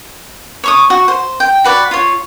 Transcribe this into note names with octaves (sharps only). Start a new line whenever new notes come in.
C#5 C#6 D#6
F#4
C5
G5
F#4 B4 D5
F4 C#5